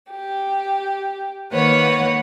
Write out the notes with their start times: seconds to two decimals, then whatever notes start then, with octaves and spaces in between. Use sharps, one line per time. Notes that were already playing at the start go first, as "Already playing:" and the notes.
0.11 G4
1.53 D#3 A#3 B4 C#5 F#5